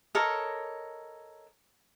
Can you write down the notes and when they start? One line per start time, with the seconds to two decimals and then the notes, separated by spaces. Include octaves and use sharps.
0.15 A4 A#4 C#5 D#5